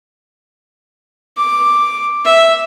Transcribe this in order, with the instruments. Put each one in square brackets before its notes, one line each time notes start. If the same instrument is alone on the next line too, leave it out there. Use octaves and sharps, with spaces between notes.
[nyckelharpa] D6
E5